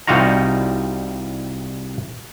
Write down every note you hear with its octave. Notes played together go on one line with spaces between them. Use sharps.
C2 G3 D#4 F4 F#4 A#5